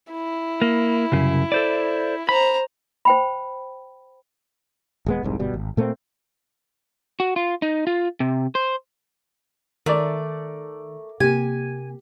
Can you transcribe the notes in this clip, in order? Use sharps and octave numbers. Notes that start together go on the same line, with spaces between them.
E4
A#3
C2 F#2 C#3
A4 C5 D5
C5 A#5 B5
C5 G5 B5
D#1 G#3 B3
F1 C2 G#2
G1 B2 G3
G#1
A#2 A3 A#3 C4
F#4
F4
D#4
F4
C3
C5
D#3 A3 A#4 D5
C3 A#3 G4 G#5